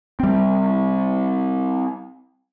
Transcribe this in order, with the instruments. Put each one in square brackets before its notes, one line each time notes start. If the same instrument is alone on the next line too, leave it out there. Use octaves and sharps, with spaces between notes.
[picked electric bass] G3 C4